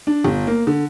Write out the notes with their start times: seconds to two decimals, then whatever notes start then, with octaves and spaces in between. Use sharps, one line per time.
0.07 D4
0.25 G1
0.47 A#3
0.67 D3